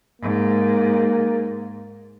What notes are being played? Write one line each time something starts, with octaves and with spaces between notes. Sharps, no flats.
G#2 A#3